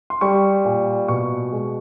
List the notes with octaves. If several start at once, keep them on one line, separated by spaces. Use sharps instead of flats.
C6
G3 C#6
A#2
B2 C#6
G#3